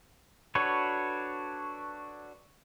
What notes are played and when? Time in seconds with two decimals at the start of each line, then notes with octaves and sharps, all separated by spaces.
0.55 D4 F#4 A4 B4 C#5